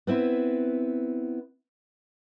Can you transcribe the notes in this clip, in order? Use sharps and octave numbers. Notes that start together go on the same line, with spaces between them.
B3 C4 E4 B4